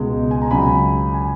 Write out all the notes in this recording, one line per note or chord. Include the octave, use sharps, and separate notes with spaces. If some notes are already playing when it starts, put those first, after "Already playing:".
Already playing: C#2 B2 G#3
G#5
A#5
C#2 C#3 F#3 G#5 B5
G#5